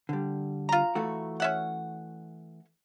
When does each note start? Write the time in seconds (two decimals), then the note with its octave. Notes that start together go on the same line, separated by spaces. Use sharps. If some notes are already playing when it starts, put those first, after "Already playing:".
0.09 D3 G3
0.69 F4 A#5
0.95 E3 A3 F#4
1.40 C#4 E5 F#5